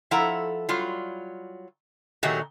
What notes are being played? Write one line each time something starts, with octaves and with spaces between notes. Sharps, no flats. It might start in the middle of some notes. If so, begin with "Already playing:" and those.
F3 E4 A4 F#5 A#5
F#3 G3 F4
A#2 D#3 F#3 A3 F#4 G4